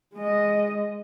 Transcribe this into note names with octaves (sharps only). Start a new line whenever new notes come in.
G#3 D#5